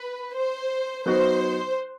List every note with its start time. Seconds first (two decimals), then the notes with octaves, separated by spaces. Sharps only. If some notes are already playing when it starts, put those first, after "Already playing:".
Already playing: B4
0.35 C5
1.06 F#3 B3 D#4 F#4 C5